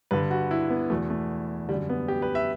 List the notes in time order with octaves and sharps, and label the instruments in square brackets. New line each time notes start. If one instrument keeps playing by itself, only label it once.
[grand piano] G2 D3 B4
F#4
E4
B3
E2 B2 A3
A3
D3 G3
F#2
B3
G4
B4
E5